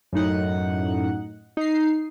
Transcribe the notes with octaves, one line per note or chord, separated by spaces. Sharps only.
F#2 A2 D#4 F#5
D#4 C7